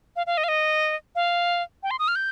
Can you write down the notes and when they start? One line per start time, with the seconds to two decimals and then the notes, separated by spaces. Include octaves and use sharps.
0.16 F5
0.27 F5
0.37 D#5
0.44 F5
0.48 D#5
1.15 F5
1.83 G5
1.91 C6
1.99 D#6
2.08 F6
2.16 G6